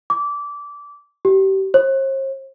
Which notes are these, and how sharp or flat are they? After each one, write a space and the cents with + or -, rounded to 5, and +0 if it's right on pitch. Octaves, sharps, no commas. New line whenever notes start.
D6 -20
G4 -30
C5 +45